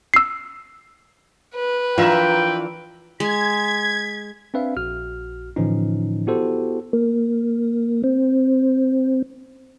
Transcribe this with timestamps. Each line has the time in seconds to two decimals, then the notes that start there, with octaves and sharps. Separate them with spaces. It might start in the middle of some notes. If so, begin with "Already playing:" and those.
0.14 E6 C7
1.55 B4
1.98 E3 F3 D4 F4 A#4 E5 G5
3.20 G#3 G#6 B6
4.54 C4 D4 B4 E5 F5
4.77 A#1 F#4 F6
5.56 A2 D3 E3 F3 C#4 D#4
6.27 B3 E4 F#4 G4 A4 C5
6.93 A#3
8.04 C4